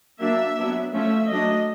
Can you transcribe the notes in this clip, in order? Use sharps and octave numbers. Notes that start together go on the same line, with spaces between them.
F#3 A#3 D4 E5
F#3 B3 D4
F3 A3 C#4 E5
F#3 A3 D4 D#5